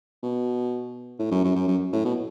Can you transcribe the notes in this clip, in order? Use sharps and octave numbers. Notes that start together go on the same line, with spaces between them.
B2
A2
F#2
F#2
F#2
F#2
A2
B2